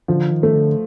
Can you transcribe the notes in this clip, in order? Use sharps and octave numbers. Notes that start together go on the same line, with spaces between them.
D3 F3
D#3
A3
D3